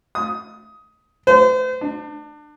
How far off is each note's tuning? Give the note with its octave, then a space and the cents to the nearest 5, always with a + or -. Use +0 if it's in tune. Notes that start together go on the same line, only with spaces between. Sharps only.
D#6 +15
C5 -40
D4 +30